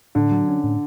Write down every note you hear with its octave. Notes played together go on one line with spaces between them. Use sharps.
A2 D3
F#3
C#4
A2